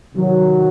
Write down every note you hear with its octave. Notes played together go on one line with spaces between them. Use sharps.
C3 D#3 F#3